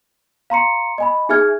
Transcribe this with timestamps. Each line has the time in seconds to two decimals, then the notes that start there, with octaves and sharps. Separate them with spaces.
0.50 F5 A#5 C6 C#7
0.98 D#5 G#5 B5
1.29 D#4 G#4 E5 G#5 F6 G#6